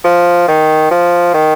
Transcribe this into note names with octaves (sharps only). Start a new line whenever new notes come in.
F3
D#3
F3
D#3